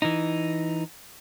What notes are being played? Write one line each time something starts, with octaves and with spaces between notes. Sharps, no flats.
E3 D#4